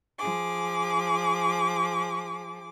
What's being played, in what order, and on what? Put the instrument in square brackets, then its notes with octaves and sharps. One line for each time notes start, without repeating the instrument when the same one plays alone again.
[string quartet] F3 G#4 D6